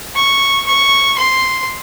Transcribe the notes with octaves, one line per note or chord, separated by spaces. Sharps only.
C#6
C#6
C6